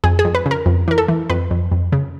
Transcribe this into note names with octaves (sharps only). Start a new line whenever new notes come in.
F2 G#4
G#4
F2
B4
C#3
A#4
F2
E3 A#4
A4
E3
F2 B4
F2
F2
C#3